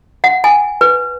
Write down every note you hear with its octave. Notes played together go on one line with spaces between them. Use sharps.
F#5
G#5
B4